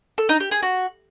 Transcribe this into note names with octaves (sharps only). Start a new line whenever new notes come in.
A4
D#4
G4
G#4
F#4